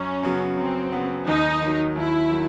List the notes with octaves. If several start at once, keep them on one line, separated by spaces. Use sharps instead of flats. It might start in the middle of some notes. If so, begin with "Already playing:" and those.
Already playing: F#2 C#4
C#3 F#3 B3
F#2 C4
C#3 F#3 B3
D#2 D#4
D#3 F#3
D#2 E4
D#3 F#3